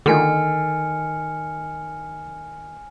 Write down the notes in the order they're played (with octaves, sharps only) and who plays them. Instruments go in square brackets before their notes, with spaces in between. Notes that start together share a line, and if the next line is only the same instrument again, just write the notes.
[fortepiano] D3 A#3 D#4 [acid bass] D#3 [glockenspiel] G#5 F6 C#7